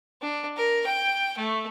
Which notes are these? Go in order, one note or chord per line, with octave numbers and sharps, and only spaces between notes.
D4
A#4
G5
A3